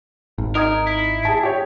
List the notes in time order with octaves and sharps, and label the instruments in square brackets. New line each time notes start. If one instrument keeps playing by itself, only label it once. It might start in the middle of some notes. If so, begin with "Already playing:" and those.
[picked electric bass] G#1
[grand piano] D#4 D#6 G#6 [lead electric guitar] A#4
[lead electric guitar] E4
[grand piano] G#4 A5
G4 C#5